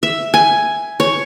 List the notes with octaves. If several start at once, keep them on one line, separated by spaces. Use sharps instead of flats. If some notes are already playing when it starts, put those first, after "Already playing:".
E5
G#5
C#5